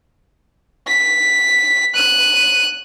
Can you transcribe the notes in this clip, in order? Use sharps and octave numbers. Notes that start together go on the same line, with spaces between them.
B6
F#6 D#7